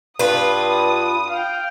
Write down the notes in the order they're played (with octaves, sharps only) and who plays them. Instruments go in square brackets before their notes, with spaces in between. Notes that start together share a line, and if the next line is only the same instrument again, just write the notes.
[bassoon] G2 [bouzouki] F4 B4 [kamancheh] D#6
[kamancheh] F5 G5